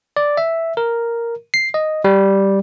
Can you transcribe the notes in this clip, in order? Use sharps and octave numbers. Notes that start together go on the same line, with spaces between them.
D5
E5
A#4
C7
D#5
G3